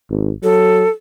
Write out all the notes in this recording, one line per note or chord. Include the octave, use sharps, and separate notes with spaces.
G#1
F#3 A4